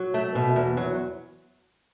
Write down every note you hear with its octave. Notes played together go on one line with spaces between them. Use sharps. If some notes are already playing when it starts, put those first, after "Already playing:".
Already playing: F#3
A3
B2
E2
F#3